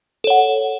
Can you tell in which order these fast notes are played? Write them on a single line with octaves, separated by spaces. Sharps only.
A4 C#5 F#5